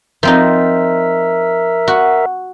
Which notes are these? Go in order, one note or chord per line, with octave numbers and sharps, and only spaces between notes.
F3 C4 D#4 A#4 E5
F#4